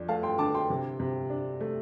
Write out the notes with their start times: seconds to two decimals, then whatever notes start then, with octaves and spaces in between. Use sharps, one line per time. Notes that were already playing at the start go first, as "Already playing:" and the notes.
Already playing: F2 D4
0.08 A3 F5 A5
0.23 G5 C6
0.38 D3 A5 D6
0.54 G5 C6
0.70 C3
1.00 C3
1.30 D4
1.61 A3